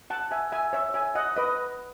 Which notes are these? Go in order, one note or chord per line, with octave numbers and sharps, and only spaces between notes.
F#5 A5
E5 G#5
E5 G#5
C#5 E5
E5 G#5
D#5 F#5
B4 D#5